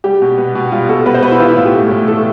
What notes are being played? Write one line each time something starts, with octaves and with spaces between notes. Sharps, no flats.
G3 G4
B2
B3
B2
G3 F4
B2 A4
B3 B4
C5
B2 B4
E4
E3 F4
E4
A2 F4
G4
A3
A2
E3 A4